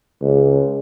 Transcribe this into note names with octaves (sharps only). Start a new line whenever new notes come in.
C#2